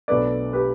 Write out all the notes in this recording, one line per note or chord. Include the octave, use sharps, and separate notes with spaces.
B1 B2 A3 D4 B4 D5
G4 B4